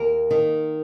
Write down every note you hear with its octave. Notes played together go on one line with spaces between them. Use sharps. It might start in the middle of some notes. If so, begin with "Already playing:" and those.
Already playing: D#2 A#3 A#4
D#3